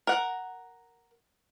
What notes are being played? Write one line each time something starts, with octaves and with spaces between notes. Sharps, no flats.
A#4 F#5